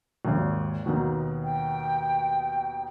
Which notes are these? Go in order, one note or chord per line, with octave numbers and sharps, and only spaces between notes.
G#1 D#2
D#2 B2 D#3
G5